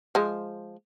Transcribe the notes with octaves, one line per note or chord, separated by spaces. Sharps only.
F3 G#3